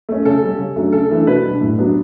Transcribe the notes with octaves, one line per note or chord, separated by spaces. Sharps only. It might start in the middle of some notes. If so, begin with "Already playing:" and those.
A3 C#4
C#3 A4
G3 C#4
C#3
F#3 A3 D4
C#3 A4
E3 A3 D4
B2 B4
G3 D4
A2
F#3 B3 D4